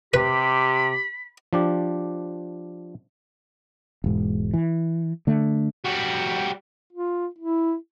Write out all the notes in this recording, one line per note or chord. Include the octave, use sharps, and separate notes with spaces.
C3 G4 B4 B5
F3 D4 G4
E1 G#2
E3
D3 A3
G3 F#4
F4
E4